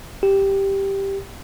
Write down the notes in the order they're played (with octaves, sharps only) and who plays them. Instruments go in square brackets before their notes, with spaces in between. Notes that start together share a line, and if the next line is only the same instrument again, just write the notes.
[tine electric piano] G4